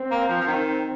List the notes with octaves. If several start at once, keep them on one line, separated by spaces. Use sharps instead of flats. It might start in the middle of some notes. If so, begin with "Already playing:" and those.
Already playing: C4
A#3
F3
F3
D#3